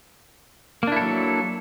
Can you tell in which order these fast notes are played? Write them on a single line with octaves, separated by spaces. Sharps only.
A#3 D4 E4 A4 F#3